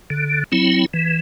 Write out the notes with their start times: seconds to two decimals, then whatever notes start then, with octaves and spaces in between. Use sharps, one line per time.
0.10 D3
0.52 F#3 C4 E4
0.94 E3